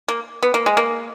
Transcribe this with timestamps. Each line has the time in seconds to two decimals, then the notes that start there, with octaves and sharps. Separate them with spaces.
0.08 A#3
0.43 B3
0.54 A#3
0.66 G#3
0.77 A#3